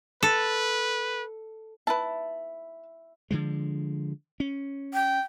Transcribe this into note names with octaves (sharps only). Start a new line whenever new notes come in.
A4 B4
E4 B4 A5
D3 F3 G#3
C#4
G5